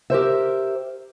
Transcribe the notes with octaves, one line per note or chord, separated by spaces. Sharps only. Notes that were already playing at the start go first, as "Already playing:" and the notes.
G4 A#4 C5 E5